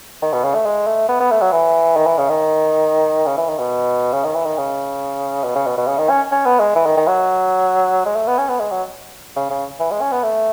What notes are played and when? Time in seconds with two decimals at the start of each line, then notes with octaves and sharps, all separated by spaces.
0.22 D#3
0.33 B2
0.44 C#3
0.54 A3
0.66 G#3
0.87 A3
1.09 B3
1.20 B3
1.31 A3
1.42 F#3
1.52 E3
1.96 D#3
2.06 E3
2.18 C#3
2.29 D#3
3.26 C#3
3.37 E3
3.49 D#3
3.59 B2
4.13 C#3
4.24 D#3
4.36 E3
4.46 D#3
4.58 C#3
5.44 B2
5.55 C#3
5.66 B2
5.77 B2
5.87 C#3
5.98 D#3
6.09 C#4
6.31 C#4
6.45 B3
6.60 G#3
6.75 E3
6.86 D#3
6.97 D#3
7.07 F#3
8.05 G#3
8.16 A3
8.27 B3
8.38 C#4
8.49 B3
8.60 G#3
8.71 F#3
9.36 C#3
9.50 C#3
9.79 E3
9.91 G#3
10.01 C#4
10.12 B3
10.23 A3